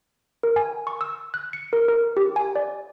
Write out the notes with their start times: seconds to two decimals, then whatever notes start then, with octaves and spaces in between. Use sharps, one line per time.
0.43 A#4
0.56 G#5
0.87 C#6
1.01 E6
1.34 F#6
1.53 C#7
1.73 A#4
1.88 A#4
2.17 G4
2.36 G#5
2.56 D5